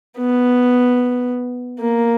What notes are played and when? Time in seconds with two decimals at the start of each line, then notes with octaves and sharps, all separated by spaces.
0.18 B3
1.80 A#3